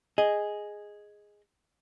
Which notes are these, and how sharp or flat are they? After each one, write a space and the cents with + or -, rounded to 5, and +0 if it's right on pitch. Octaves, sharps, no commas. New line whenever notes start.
G#4 +0 D#5 +0